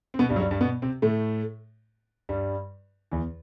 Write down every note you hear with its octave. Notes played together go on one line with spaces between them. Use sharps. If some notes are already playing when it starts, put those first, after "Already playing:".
C4
B2 B3
G2 G3
F#3
G2 G3
G2 G3
B2 B3
C3 C4
A2 A3
G2 G3
E2 E3